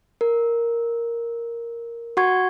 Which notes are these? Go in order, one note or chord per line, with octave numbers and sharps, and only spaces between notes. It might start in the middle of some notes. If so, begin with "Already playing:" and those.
A#4
F#4 F#5 C#6 G#6